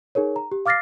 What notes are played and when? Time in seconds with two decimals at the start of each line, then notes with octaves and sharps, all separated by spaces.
0.15 D#4 G#4 A#4 C#5
0.36 A#5
0.51 G4
0.66 F5 D6 F6 A6 A#6 C7